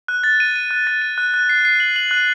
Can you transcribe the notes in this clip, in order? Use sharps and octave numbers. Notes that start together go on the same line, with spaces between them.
F#6
A6
D#7
D#7
F#6
A6
D#7
F#6
F#6
C7
C7
F#7
F#7
F#6